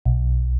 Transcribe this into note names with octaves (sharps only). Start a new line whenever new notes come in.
B1